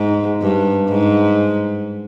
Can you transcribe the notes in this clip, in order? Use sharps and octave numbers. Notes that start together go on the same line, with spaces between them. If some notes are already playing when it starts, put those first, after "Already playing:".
Already playing: G#2
G2
G#2